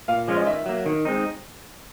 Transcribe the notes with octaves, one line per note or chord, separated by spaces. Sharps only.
A#2 F5
F3 G#3 C#4 F4
D#5
D#3 E5
F#3 A#3
D#3
G#3 C4 D#4